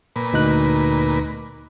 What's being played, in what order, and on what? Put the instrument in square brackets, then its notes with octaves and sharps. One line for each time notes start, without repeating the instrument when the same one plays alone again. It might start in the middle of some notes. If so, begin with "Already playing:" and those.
[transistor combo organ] A#2 B4
[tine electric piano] D2 D#4 F#6